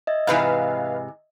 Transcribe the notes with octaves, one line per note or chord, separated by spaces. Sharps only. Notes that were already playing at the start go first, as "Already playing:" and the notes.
D#5 E5 G#6
G#2 C3 E3 B4 F5